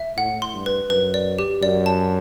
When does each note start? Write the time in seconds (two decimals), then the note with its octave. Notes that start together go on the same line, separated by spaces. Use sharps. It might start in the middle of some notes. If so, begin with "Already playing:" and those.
Already playing: E5
0.17 A2 F#5
0.42 C6
0.54 G2
0.66 B4
0.90 F#2 B4
1.14 D5
1.38 G4
1.62 F#2 D5
1.86 A5